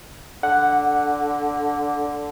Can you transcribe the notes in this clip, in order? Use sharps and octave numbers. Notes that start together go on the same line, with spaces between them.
D3 F#5